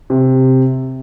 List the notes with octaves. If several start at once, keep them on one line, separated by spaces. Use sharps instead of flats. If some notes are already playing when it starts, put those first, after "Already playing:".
C3